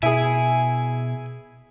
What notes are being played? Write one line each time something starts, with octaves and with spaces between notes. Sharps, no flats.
B2 E4 G#4 G#5